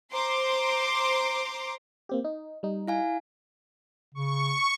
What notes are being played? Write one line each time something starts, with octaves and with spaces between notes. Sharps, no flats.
C5 A#5 C6 D6
A#3 C4 G4
D#4
G3 D#4
E4 F5 G#5
C#3 C#6